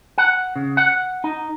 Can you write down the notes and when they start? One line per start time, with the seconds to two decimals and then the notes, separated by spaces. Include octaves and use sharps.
0.18 F#5
0.56 C#3
0.77 F#5
1.24 D#4